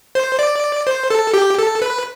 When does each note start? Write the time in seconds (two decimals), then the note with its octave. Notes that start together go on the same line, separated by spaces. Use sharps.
0.15 C5
0.39 D5
0.87 C5
1.10 A4
1.34 G4
1.58 A4
1.82 B4